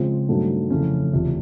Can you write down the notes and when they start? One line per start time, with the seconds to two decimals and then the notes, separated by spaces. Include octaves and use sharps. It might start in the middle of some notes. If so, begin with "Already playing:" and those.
Already playing: C#3 F3 G#3 C4 F4
0.29 G2 D#3 F#3 A3 C4
0.70 F2 C#3 E3 A3 C#4
1.13 F1 E2 C3 F3